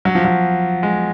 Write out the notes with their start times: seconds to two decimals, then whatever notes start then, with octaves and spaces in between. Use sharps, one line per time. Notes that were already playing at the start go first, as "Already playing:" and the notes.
0.05 F#3
0.15 F3
0.25 F#3
0.83 G#3